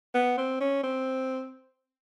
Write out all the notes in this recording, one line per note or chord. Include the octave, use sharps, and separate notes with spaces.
B3
C4
C#4
C4